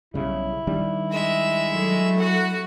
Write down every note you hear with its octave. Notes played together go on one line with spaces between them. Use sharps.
B1 C#3 G3 E4
D#3 G3 D4
G#3 E5
F#3 A3
F#4 F#5